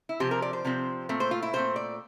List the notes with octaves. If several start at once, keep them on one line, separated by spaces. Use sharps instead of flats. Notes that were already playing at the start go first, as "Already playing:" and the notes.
E4
C3 F3 C4 G4
A#4
D5
C5
C3 F3 C4
A#2 A3 C4
C5
F4
E4
A#2 A3 C4 C5
D5